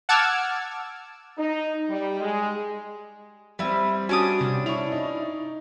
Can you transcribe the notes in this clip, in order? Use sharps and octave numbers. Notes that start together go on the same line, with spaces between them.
F#5 A5 D6 E6 F6 G#6
D#4
G3
G#3
G3 C4 E4 B4
C#4 D4 F#4 D#6
C3
E4 C#6 F7
D#4